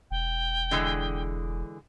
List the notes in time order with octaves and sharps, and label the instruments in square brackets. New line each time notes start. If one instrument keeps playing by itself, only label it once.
[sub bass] E1 [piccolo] G5
[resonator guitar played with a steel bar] D3 E3 G#3